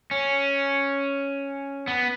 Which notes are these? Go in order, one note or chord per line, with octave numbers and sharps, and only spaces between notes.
C#4
B3